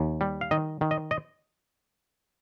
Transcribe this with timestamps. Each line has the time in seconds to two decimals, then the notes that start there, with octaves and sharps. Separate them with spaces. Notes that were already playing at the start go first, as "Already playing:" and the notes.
Already playing: D#2
0.21 G3
0.41 F5
0.51 D#3 D#5
0.81 D#3
0.91 D#5
1.11 D#5